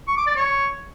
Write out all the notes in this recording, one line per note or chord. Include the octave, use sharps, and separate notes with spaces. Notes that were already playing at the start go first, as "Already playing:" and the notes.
C#6
D6
D5
C#5